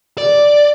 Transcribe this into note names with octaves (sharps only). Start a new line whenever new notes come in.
D5